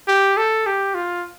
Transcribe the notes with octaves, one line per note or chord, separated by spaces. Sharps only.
G4
A4
G4
F4